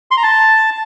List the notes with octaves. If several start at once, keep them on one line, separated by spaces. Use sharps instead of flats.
C6
A#5
A5